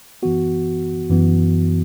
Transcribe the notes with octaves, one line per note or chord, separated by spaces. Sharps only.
F#2 E3 B3 F#4
F#2 E3 B3